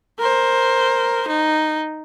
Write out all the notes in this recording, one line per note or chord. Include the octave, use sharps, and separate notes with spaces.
A#4 C5
D#4